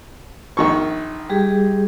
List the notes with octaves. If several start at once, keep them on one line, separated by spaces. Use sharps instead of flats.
A#1 D#3 C#6
G3 G4 G#4